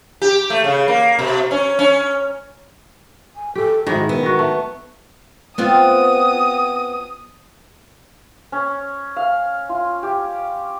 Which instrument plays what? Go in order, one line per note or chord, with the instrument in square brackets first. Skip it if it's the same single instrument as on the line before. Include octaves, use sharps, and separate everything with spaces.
[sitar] G4
A3
C#3
A#3
B2
C#4
C#4
[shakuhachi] G#5
[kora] G4 [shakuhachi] A4
[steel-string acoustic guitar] G#2 [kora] D#3 G#3 E4 [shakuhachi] F#4
[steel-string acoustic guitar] B3 [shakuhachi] A#4 [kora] E5
[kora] D#3 F#4
A3
[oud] B3 C4 F4 [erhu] D#6
[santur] C#4
F5
F4
G4